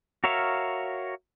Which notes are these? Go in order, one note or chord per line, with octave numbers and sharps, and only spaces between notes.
F#4 A#4 C#5 E5 F5